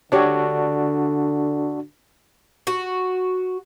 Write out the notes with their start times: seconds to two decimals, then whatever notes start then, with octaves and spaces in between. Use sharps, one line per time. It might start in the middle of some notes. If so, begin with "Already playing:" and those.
0.12 D3 D4 F#4 G4 C#5 D5
2.67 F#4